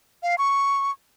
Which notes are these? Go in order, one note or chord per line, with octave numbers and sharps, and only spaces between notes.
F5
C#6